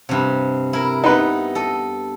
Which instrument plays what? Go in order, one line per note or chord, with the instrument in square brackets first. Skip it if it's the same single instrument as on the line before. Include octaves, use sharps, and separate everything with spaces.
[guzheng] G2 C3
E4 A#4
[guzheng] B3 [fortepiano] D#4 B4
[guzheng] A4 D#5